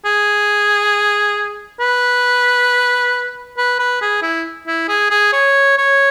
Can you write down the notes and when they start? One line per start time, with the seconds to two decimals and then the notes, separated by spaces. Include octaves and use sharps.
0.05 G#4
1.80 B4
3.57 B4
3.79 B4
4.02 G#4
4.23 E4
4.67 E4
4.89 G#4
5.10 G#4
5.33 C#5
5.78 C#5